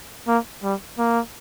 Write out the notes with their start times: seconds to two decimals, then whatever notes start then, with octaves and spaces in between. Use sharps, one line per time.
0.27 A#3
0.63 G3
0.98 A#3